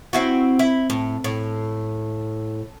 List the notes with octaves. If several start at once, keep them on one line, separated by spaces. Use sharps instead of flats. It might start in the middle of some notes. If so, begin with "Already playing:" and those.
C4 E4 F#4
E4
A2
A2